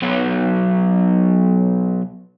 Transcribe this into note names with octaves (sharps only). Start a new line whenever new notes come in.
B1 F#3